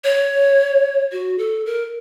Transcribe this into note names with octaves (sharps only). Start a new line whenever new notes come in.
C#5
F#4
A4
A#4